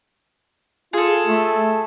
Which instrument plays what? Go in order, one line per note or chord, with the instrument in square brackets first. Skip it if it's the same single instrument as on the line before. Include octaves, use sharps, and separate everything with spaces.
[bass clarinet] F4 [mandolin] G#4 A4
[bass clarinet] A3